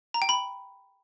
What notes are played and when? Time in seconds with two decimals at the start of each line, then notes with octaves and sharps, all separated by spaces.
0.14 A#5
0.22 G5
0.29 B5